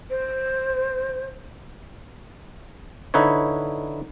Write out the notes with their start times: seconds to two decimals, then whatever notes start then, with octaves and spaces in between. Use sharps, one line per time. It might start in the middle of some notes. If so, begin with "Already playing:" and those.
0.10 C5
3.14 D3 D#4 E4 B4 C#5